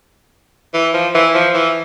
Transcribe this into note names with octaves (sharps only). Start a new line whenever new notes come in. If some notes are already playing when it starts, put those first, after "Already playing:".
E3
F3
E3
F3
E3